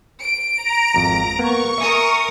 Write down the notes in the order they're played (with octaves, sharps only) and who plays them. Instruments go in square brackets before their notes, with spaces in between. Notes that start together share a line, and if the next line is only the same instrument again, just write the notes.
[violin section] D7
[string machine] A#5
[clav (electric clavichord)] G#1 F2
[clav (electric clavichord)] A#3 B3 [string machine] C#6
[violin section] A#4 D#6 [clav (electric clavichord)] E5 G#5